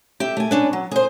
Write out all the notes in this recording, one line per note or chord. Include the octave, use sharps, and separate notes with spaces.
G4 E5
A3 G#5
C#4 D4 B4
F#3
G#4 C5